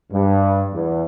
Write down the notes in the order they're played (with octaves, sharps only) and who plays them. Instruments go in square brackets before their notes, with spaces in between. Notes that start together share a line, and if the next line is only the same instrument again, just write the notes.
[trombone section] G2
E2